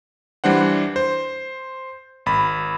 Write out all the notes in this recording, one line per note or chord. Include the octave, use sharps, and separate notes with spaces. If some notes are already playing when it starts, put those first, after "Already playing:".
E3 G3 D4 C5 F#5
C5
G#1 B5